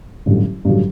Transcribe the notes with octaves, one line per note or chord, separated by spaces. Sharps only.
A1 G2 D3 F#3
A1 G2 D3 F#3